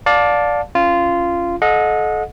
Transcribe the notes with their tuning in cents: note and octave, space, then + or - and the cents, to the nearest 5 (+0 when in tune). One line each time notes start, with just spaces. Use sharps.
D5 +0 F5 +25 A5 +0
C#4 +0 F4 -15
A4 -30 D#5 +0 F#5 -35